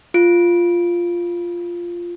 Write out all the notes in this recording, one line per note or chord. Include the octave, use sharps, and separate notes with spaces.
F4 D7